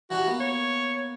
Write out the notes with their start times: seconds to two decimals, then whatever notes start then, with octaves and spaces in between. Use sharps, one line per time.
0.11 E3 D4 F#4 G4
0.27 A#3 B3
0.40 C#5